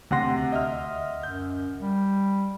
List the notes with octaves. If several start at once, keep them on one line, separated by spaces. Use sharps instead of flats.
D2 C3 F#5 C6 A#6
D#5 E5 F6
F#2 G6
G3